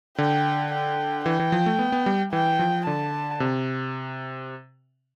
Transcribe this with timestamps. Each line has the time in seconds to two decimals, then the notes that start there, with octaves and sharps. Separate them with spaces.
0.18 D3 G5
0.72 G5
1.26 E3 G5
1.40 E3
1.52 F3
1.66 A3
1.79 B3
1.92 B3
2.06 G3
2.32 E3 G5
2.59 F3
2.86 D3 A5
3.40 C3